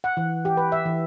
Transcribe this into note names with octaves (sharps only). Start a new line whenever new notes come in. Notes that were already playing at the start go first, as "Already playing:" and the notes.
F#5
E3
G4
B4
E5
E3